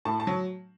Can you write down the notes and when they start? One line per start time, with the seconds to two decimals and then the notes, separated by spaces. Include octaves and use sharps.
0.05 A2 A5
0.20 A5
0.27 F#3